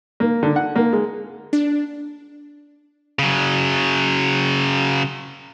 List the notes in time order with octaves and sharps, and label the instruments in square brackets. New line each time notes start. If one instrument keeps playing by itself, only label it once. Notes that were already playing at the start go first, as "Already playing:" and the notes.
[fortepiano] A#3
D3
F#5
A#3
G#3
[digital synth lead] D4
[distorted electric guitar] C#3 F#3